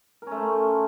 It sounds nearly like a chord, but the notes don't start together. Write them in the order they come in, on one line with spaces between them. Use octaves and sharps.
A#4 C#4 A3 C5